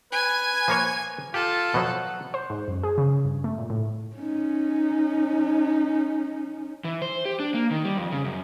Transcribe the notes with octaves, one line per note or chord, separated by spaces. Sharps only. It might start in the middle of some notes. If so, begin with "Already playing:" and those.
B4 G#5 G#6
F3 A#3 C#5
F4 G4 A4
B2 F3 F#3 F#5
C5
G#2
F#2
G#4
C#3
G2
A3
A#2
A2
C#4 D#4
E3
C5
G4
D4
A#3
D#3
G3
F2
C#3
F#2